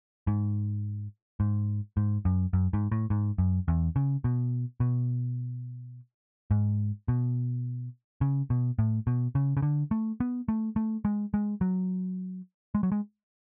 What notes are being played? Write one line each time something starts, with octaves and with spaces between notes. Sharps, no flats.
G#2
G#2
G#2
F#2
F#2
G#2
A2
G#2
F#2
E2
C#3
B2
B2
G#2
B2
C#3
B2
A2
B2
C#3
C#3
D3
A3
B3
A3
A3
G#3
G#3
F#3
G#3
F#3
G#3